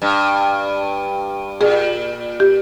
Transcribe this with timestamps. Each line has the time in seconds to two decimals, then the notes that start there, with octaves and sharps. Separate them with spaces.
0.02 G2
1.61 A#2 G#4
2.40 G4